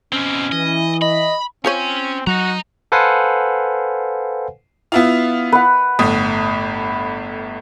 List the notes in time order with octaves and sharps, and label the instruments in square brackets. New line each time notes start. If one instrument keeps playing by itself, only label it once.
[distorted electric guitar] B2 C4 [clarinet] C#4
[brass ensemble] E3 [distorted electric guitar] D#5
[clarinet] D#5 [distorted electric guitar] B5
[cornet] C4 [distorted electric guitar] C#4 G#5 [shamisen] F4 C5 C#5
[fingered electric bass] F#3 [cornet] F#4 [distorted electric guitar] D#5 A#5
[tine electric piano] A4 B4 C5 F5 F#5 G#5
[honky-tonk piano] B3 E4 F4
[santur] B4 F#5
[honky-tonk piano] G1 A2 D#6